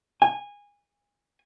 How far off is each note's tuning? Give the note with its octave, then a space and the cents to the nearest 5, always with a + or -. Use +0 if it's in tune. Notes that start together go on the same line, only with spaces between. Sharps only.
G#5 -20